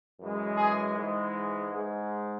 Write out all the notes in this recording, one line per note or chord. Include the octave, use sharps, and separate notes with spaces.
F#2 E3 G#3
G#4
G#2 E3 G#3
G#2 G#3